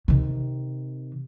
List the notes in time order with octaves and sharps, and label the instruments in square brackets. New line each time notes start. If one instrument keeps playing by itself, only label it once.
[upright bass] C3 D#3